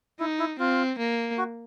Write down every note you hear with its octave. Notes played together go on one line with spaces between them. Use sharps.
D#4 E4
E4
C4 F4
A#3
F#4